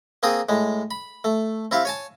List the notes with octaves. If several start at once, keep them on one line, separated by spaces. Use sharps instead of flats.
A#3 C4 G#4 G5 D#6
A2 G#3
B5
A3
C4 E4 G4 F5
C#5 G#5 A5